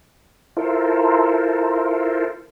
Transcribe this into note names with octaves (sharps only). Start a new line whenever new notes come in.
E4 F4 A4 A#4 C5